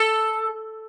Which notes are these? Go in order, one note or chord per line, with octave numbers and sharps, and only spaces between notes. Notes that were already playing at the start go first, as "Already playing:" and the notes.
Already playing: A4